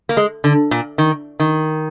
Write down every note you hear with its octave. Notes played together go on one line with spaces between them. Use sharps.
A#3
G#3
D3
A#2
D#3
D#3